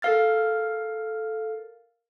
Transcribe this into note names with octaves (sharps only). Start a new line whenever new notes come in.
A4 A#4 F5 F6 A6